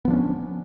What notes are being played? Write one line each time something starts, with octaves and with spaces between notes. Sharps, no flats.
F3 B3 C#4 D4